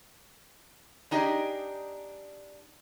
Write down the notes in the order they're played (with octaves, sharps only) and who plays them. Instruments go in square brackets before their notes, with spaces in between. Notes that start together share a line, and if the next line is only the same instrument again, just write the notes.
[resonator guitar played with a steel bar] D4 D#4 G4 G#4 D#5